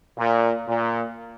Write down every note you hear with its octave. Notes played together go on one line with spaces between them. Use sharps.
A#2
A#2